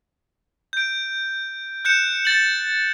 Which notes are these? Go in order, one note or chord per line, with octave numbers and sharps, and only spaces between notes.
G6 D7
F#6 G6 C#7 E7
A6 F#7